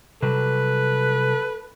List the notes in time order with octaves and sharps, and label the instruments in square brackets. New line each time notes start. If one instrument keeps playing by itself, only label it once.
[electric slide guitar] C3 F#3 G3 [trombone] A4 [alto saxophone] B4